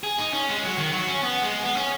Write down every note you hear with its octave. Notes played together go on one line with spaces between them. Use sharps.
G#4
D#4
C#4
G#3
F#3
D#3
F#3
C#4
B3
G#3
B3
C#4